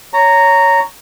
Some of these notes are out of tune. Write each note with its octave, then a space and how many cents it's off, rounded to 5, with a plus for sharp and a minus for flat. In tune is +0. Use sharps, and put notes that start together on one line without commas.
C#5 +10 A#5 -10